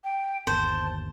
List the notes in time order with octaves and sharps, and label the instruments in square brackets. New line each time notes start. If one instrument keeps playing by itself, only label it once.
[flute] G5
[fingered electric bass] G1 D#2 [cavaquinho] C5 [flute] A5